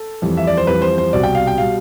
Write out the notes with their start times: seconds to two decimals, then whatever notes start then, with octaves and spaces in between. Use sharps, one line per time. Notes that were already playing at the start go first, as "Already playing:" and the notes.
Already playing: A4
0.22 F2 E3 G3
0.37 E5
0.47 D5
0.57 C5
0.67 F2 E3 G3 B4
0.82 C5
0.98 C5
1.13 C2 B2 G3 D5
1.23 G5
1.35 F5
1.47 G5
1.58 B2 G3 F5